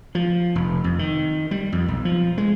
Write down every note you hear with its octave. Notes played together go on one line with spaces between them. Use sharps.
F3
F1
F2
D#3
G3
F2
B1
F3
G#3